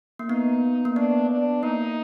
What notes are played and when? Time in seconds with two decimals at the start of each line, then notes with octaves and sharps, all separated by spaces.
0.19 A#3
0.29 B3 D#4
0.85 A#3
0.96 B3 D4
1.30 D4
1.63 A#3 D#4